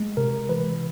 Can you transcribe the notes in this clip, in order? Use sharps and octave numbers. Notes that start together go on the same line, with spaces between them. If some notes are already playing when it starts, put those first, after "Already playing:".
Already playing: G#3
C3 A#4
E3 B4